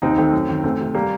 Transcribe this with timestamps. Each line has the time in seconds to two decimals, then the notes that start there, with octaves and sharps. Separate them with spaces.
0.02 D#2 C4 D#4
0.18 D#3 A3 C4
0.33 F#2
0.49 D#3
0.64 D2 A3 C4
0.79 C3 D#3
0.95 G3 A#3